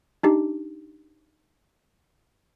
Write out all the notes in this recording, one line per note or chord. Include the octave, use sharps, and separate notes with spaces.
D4 D#4 G4